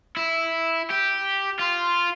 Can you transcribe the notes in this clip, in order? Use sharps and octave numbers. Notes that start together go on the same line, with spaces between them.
E4
G4
F4